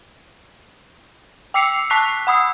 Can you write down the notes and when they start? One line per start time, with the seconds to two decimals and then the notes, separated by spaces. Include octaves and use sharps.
1.54 G5 D6 E6 C7 C#7 F7
1.90 A5 C#6 F#6 B6 C7 F7
2.27 F#5 B5 D#6 E6